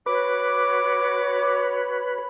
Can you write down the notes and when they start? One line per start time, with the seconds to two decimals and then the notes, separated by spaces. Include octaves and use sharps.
0.06 F#4 B4 C#5 D6